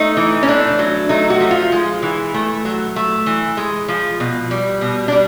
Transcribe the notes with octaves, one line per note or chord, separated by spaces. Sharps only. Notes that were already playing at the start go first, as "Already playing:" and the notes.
Already playing: A3 D#4
E3
C#4
A3 D4
F#3
A3 D#4
F#4
F3
F4
G#3
E3
A3
F#3
A3
E3
G#3
F3
B2
G3
B2
D4
G3